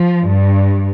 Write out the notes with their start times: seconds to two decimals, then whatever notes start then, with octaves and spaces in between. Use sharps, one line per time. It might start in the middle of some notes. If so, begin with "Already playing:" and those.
Already playing: F3
0.28 G2